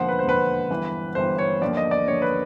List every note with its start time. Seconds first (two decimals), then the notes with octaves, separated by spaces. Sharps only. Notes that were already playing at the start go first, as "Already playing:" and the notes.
Already playing: E1 D#2 D3 F3 C5 F#5
0.09 B4
0.19 C5
0.24 E1 D#2 D3 F3 B4
0.69 G1 G2 E3
1.15 G1 G2 E3 C5
1.38 C#5
1.61 D#2 D3 F3 D5
1.77 D#5
1.91 D5
2.07 D#2 D3 F3 C#5
2.22 B4